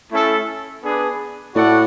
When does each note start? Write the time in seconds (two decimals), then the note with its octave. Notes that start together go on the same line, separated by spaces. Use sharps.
0.11 A3 C#4 E4 A4
0.83 B3 D4 G#4 B4 D5
1.55 A2 F#4 A4 D5 F#5